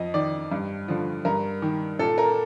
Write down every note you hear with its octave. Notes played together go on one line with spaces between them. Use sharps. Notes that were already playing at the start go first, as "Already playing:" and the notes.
Already playing: F2 D#5
D#3 D5
G2
D3 F3
G2 A#4
D#3
A#2 A4
A#4